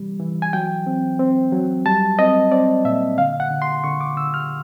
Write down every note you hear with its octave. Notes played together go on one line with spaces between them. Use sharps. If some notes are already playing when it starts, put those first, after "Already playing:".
Already playing: C3 E3 G3
E3
G#5
F#3 G5
C4
C4
F#3
G3 A5
C4 D#5
C4 D5
A#2 E5
D3 F5
F#5
D3
C6
D3 C#6
D6
D3 E6
F6